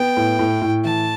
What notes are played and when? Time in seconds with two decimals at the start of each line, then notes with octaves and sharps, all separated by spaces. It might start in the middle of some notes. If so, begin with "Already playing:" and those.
Already playing: B3 G5
0.17 A2
0.39 A2
0.62 A2
0.84 E3 A5